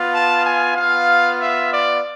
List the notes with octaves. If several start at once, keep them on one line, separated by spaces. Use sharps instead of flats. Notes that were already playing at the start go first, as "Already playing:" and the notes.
Already playing: B3 F4
A5
G#5
B3 F4 F5
E5
D5